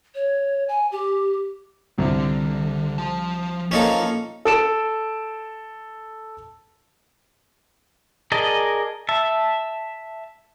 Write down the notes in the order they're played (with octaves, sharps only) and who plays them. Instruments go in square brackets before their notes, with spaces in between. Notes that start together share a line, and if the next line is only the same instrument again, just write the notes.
[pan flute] C#5
G#5
G4
[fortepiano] C2 [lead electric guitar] D3
[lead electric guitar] F3 A5
[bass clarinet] A#3 [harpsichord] C#4 D#4 A4 [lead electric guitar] F4 C5
[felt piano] A4 D7 E7
[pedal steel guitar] G#4 A#4 D5 D#5 A5
E5 A5